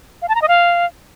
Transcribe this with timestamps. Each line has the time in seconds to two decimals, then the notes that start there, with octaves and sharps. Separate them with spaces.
0.22 F5
0.28 A5
0.35 A#5
0.42 D#5
0.48 F5